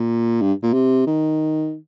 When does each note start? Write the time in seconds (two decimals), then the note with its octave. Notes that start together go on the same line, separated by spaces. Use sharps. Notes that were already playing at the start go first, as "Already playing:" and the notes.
Already playing: A#2
0.41 G2
0.63 A#2
0.73 C3
1.07 D#3